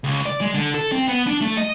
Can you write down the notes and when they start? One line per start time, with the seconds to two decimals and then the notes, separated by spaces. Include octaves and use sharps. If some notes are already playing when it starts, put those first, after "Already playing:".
0.04 C#2
0.26 D5
0.41 G#3
0.54 D3
0.74 A4
0.92 C4
1.08 B3
1.27 D4
1.41 A3
1.57 D#5